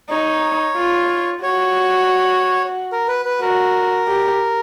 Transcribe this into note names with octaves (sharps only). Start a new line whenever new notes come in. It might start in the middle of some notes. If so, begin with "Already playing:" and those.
D#4 C#5
F4
F#4 C#5
A#4
B4
B4
F#4 A#4
G4